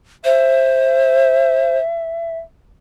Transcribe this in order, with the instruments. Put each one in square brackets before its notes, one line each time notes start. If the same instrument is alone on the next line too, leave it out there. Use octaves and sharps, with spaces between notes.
[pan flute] C5 [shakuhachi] E5